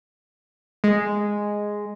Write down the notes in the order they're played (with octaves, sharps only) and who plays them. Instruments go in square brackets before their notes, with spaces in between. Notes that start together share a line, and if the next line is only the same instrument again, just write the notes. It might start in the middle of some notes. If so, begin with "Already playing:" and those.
[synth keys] G#3